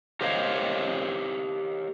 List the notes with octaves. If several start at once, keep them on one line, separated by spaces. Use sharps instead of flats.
G4 A#4 C5 C#5 D#5 F5